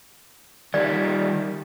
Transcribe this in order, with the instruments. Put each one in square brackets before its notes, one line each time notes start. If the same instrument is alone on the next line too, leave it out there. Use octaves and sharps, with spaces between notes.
[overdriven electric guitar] D#3 G3 [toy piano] D5